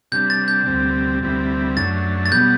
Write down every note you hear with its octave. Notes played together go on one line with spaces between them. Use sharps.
C3 G3 D4 G6
A6
G6
D2 C3 G3 C4
D2 C3 G3 C4 E4
F#2 F#3 A3 D4 A6
A6
B2 G3 B3 G6